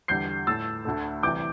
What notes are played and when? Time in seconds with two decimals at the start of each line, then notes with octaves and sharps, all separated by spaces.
0.08 E2 D3 G3 G6 C7
0.47 A2 A3 E6 A6
0.85 D2 D3 A3
1.23 C2 C3 E3 D6 G6